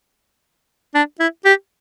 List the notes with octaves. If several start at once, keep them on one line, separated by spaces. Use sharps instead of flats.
D4
E4
G4